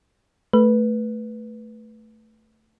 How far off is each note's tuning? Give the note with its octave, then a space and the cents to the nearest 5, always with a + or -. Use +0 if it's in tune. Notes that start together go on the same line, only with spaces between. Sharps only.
A3 +0 B4 -10